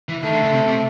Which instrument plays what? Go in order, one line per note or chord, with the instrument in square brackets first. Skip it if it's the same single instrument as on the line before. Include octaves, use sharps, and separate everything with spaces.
[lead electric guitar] E3
[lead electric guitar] D#3 [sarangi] A3
[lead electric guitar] D3
C#3
C3
C3